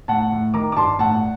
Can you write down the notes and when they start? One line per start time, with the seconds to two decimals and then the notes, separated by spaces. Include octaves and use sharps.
0.08 A2 F#5 A5
0.32 A2
0.54 D#3 A#5 D6
0.72 D6
0.76 G2 A5 C6
0.99 A2 F#5 A5